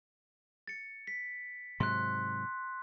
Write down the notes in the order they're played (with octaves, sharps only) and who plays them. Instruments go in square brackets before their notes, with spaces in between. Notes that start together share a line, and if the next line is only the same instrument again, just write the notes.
[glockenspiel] A6 C#7
B6
[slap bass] G#2 C3 F#3 [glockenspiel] C6 F#6